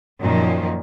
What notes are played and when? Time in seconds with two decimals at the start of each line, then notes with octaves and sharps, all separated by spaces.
0.21 F#2 A#2 D#3 F3